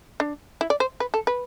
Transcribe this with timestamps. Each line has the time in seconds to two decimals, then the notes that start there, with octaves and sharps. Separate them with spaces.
0.20 D4
0.61 E4
0.70 D5
0.80 C5
1.00 B4
1.14 A4
1.27 B4